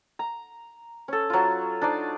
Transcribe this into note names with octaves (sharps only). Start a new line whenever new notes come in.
A#5
C#4 A4
F#3 F4
D4 D#4 C5 D5